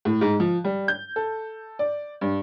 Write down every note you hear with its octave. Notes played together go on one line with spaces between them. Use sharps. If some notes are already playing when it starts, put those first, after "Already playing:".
A2
G#2
F3
G3
G6
A4
D5
G2